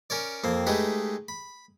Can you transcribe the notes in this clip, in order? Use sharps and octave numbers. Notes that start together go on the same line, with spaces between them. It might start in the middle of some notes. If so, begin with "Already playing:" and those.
C#4 A#4 C#5 D5
F2 A#3 C4
G#3 A3 D#4 G4 B4
B5